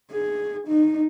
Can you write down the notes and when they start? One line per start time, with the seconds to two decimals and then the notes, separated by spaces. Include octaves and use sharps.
0.11 G#4
0.68 D#4